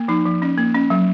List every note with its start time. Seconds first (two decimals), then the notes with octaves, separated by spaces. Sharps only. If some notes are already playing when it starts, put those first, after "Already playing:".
Already playing: A#3
0.08 F3 D#4
0.25 F3
0.42 C#4
0.57 A#3
0.74 C#4
0.90 F#3